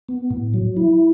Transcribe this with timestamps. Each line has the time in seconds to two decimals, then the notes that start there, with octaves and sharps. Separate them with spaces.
0.09 B3
0.30 A2
0.54 F#3
0.77 E4